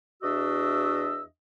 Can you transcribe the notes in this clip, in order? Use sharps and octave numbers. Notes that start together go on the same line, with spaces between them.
E2 D4 F#4 D#5 E5 E6